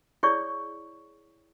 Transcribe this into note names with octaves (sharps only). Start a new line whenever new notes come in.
E4 G#4 C#5 D5 C#6